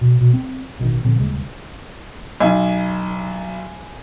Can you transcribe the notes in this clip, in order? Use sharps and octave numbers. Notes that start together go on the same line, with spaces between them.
B2
B2
C4
A1 B2 D#3
A#2 D3 F3 C4
D#1 C#3 G#3
B1 G#5